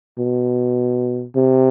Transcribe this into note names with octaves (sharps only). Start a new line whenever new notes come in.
B2
C3